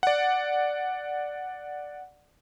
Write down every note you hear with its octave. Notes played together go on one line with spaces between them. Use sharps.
D5 F#5